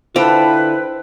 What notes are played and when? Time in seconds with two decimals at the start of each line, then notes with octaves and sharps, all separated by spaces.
0.16 D3 E4 F4 B4 C5 G5 A5